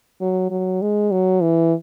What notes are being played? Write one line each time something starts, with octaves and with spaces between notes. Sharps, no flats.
F#3
F#3
G#3
F#3
E3